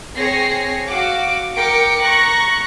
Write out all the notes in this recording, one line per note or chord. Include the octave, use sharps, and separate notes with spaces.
C4 G#4 C#5 A#6 C7
F#4 F5 D6
A#4 G5 D6 C#7
A#5 C#6 F#6 A#6